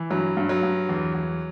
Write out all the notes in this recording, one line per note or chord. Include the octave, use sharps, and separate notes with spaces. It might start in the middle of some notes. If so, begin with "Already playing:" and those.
Already playing: E3
G2 F#3
G2
F#3
G2
E2
E2